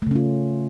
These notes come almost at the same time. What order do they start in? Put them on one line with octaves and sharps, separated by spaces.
A3 C#3 C#4 F4